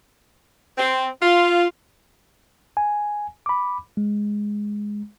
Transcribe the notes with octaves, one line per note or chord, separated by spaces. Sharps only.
C4
F4
G#5
B5 D6
G#3